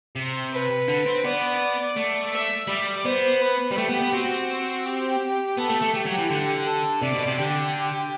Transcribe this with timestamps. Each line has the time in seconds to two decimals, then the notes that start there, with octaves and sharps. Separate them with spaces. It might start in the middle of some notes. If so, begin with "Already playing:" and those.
0.16 C3
0.52 B4
0.88 D3
1.06 C4
1.24 B3 D5
1.97 A3
2.33 E5
2.69 G3 D5
3.05 B3 C5
3.41 B4
3.71 G3
3.77 A3 G4
3.89 B3
4.01 B3
4.13 C4 F#4
4.85 G4
5.58 B3 A4
5.70 A3
5.82 A3
5.94 A3 G4
6.06 F#3
6.18 E3
6.30 D3
6.66 A4
7.02 C3 D5
7.15 B2
7.27 C3
7.39 D3 G4